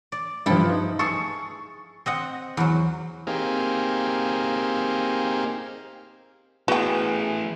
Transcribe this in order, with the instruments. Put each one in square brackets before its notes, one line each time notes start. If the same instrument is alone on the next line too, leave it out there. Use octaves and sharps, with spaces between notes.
[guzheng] D5
[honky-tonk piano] G2 F3 [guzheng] E4 A4 G5
[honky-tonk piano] D#4
[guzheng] G#4 A4 [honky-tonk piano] C#6 C#7
[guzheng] C4 D#5 F#5
E2 F#3
[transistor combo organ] A#3 C4 D#4 G4 G#4 F5
[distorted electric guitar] E3 A3 [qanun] B3 [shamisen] F#4 G5 [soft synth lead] G#4